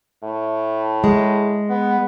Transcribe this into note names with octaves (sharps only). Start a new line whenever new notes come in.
A2
G#3
B3